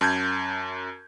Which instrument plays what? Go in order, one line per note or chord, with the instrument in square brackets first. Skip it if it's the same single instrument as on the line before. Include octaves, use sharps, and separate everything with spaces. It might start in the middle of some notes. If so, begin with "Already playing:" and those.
[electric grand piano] F#2 A5 G6 G#6